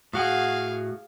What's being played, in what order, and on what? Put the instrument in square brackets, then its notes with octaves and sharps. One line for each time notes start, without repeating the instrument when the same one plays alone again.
[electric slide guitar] A2 F#4 F#5 [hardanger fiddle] G#4 F5